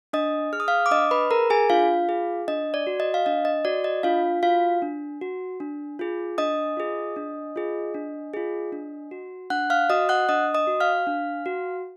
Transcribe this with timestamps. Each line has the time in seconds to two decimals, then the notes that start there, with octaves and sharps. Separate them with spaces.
0.13 D4 D#5 D#6
0.53 G#4 F6
0.60 D#6
0.68 F5 F6
0.86 D6
0.91 D4 D#5 D#6
1.11 B4 B5
1.31 G#4 A#4 A#5
1.50 G#4 G#5
1.70 D4 F4 F5
2.09 G#4
2.48 D4 D#5
2.74 D5
2.87 F#4
3.00 D#5
3.14 F5
3.26 D4 D#5
3.45 D#5
3.65 F#4 D5
3.84 D#5
4.03 D4 F4 F5
4.42 F4 F#4 F5
4.82 D4
5.21 F#4
5.60 D4
5.99 F4 G#4
6.38 D4 D#5 D#6
6.77 F4 G#4
7.16 D4
7.56 F4 G#4
7.94 D4
8.33 F4 G#4
8.72 D4
9.11 F#4
9.50 D4 F#5 F#6
9.70 F5 F6
9.89 F#4 D#5 D#6
10.09 F#5 F#6
10.29 D4 D#5 D#6
10.54 D#5 D#6
10.67 F#4
10.80 F5 F6
11.07 D4
11.46 F#4